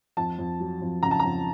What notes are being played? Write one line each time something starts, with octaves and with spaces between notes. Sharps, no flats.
F2 A5
F2
F#3
F2
C#3 A#5
A5
A#5
F2